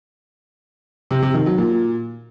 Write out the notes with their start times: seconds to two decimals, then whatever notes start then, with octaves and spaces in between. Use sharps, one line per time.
1.11 C3
1.22 C3
1.34 D#3
1.46 F#3
1.58 A#2